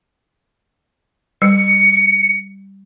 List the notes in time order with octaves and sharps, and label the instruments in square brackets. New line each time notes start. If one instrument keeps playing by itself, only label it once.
[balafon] G3 [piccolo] C#7